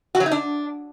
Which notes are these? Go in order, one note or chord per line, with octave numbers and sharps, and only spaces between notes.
F#4
F#3
D#4
D4